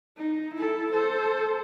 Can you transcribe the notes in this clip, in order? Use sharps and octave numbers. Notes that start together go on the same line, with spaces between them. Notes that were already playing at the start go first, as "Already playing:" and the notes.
D#4
E4 A4
A4 C5